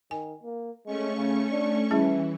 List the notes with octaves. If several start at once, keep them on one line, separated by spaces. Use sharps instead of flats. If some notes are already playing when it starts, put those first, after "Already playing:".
D#3 G#5
A#3
G#3 A3 C#4 C#6
C#3
D4
E3 G3 C#4 E4 G#4